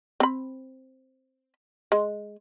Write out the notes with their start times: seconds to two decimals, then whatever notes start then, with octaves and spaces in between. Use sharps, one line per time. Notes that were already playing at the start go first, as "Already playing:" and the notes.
0.20 C4 B5
1.92 G#3